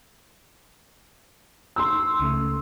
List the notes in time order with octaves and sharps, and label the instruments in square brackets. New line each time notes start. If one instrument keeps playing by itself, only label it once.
[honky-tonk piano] C6 E6
[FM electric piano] C#2 C#3 A3